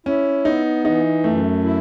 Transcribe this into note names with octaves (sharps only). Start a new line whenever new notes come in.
C#4 E4
B3 D#4
E3 D#4
F#2 A3
E4